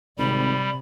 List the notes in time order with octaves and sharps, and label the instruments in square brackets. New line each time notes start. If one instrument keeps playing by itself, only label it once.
[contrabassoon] G#1 [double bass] C3 [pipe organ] G3 [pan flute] B5